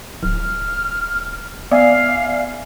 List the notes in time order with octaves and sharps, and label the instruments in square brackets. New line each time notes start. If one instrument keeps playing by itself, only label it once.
[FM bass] D1 [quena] F6
[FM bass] B3 [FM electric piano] D5 E5 G#5 [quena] F5